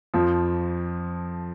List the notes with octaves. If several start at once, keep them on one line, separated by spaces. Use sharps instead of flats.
F2 F3